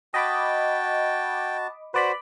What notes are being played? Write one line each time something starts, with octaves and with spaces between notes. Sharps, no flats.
F#4 D#5 G5 A5 B5 D6
F#4 B4 C5 D5 B5